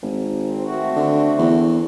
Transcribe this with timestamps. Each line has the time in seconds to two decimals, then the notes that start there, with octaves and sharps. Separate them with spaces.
0.03 G#1
0.46 C4
0.65 A3 C4 F#4
0.96 D3
1.38 E2